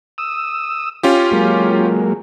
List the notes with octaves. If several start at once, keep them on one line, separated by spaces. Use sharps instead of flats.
D#6 E6
C#4 F4 G4
F#3 G#3 A#3